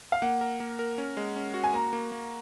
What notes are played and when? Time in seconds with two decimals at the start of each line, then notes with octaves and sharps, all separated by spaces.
0.12 F5
0.22 A#3 F#5
0.41 A#4
0.60 A#3
0.79 A#4
0.98 C#4
1.17 G#3
1.36 C#4
1.54 F#4
1.64 G#5
1.74 A#3 A#5
1.93 A#3
2.12 A#3